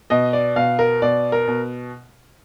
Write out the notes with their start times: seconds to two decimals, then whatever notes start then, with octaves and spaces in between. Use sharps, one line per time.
0.10 B2 D#5
0.33 D5
0.56 B2 F5
0.79 A#4
1.02 B2 D5
1.32 A#4
1.48 B2